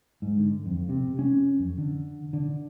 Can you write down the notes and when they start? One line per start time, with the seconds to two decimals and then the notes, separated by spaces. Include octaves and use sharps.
0.22 G#2
0.38 D3
0.66 F2
0.89 C3
1.19 C#4
1.59 F2
1.78 D3
2.33 D3